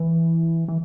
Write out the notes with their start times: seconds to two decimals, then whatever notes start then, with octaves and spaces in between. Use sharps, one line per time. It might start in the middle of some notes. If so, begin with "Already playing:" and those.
Already playing: E3
0.68 E3